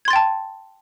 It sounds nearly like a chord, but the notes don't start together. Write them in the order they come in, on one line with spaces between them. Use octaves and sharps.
G#6 C6 A6 G5 A5